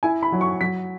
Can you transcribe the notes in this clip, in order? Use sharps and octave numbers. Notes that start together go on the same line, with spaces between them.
E4 G#5
B5
F#3
C#6
F#3 B6